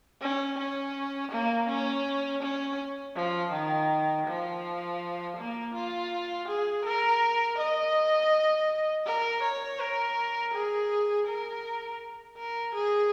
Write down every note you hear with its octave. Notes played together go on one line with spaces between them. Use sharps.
C#4
C#4
A#3
C#4
C#4
F3
D#3
F3
A#3
F4
G#4
A#4
D#5
A#4
C#5
A#4
G#4
A#4
A#4
G#4